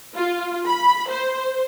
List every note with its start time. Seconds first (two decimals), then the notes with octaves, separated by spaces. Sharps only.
0.16 F4
0.67 B5
1.11 C5